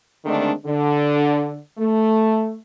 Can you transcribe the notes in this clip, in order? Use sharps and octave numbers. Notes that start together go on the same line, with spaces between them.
D3 D#3 G#3 A3 C4 D4
D3
A3